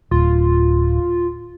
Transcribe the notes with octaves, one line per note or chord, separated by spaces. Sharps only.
D1 F4